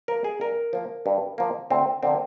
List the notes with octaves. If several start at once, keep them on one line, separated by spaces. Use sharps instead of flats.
F3 A#3 A#4
G#4
G2 A#4
F3 A#3
G2
F3 A#3
D2 C4
D3 F3 A#3 C4